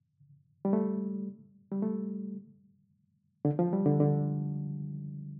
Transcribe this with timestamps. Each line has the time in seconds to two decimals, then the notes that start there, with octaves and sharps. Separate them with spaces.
0.65 G3
0.73 A3
1.72 G3
1.82 A3
3.45 D3
3.59 F3
3.73 G3
3.86 D3
4.00 D3